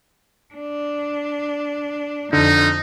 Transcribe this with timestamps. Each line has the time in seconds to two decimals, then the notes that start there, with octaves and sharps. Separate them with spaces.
0.54 D4
2.33 F2 D3 D#4